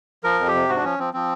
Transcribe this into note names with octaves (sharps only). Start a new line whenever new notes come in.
F3 A#4
F2
G4
C3
G#2 F#4
D4
F3 C#4
F3 C4
F3 C4